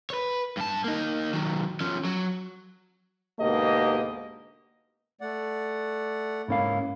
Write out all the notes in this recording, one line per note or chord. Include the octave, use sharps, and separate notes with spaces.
B4 C#5
G2 A5
A#3 D#4
D#3 F#3
F3 C#4
F#3
D2 G#2 B2 A#3 G4 D#5
A3 D5 F#5
G#2 A#3 C#4 E4 F5